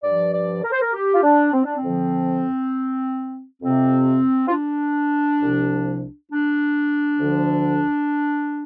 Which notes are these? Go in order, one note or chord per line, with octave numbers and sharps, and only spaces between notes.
G2 F3 D5
D5
A#4
C5
A#4
G4
F4
D4
C4
D4
C4
F2 D3 F3
F2 C3 F3 C4
F4
D4
C2 C3 F3
D4
D2 D3 F3